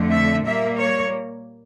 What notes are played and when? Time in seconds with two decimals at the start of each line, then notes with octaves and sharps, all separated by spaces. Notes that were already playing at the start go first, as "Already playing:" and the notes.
Already playing: F2 D3 A3
0.11 E5
0.45 A#2 G3 A#3 E5
0.77 C#5